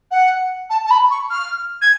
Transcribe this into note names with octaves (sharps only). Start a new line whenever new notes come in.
F#5
A5
A5
B5
C#6
F6
G#6